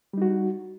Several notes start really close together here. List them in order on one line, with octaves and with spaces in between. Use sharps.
G3 D#4 F#4